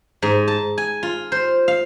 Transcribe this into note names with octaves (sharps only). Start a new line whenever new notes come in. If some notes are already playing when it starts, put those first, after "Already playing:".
G#2
A5
G#5
F4
C5
F5